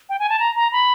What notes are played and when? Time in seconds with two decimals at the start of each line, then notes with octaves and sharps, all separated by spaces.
0.09 G5
0.19 G#5
0.29 A5
0.40 A#5
0.56 A#5
0.72 B5